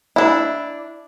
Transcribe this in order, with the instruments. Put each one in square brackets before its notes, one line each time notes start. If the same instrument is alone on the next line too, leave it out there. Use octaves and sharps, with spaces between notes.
[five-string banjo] D4 E4